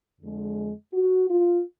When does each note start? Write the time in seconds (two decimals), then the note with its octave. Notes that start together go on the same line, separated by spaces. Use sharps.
0.21 F2 D3 G#3
0.93 F#4
1.29 F4